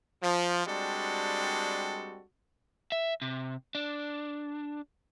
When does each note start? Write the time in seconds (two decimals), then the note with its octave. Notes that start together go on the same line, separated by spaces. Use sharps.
0.23 F3
0.66 G3 G#3 C4 D4 F#4 A4
2.92 E5
3.22 C3
3.75 D4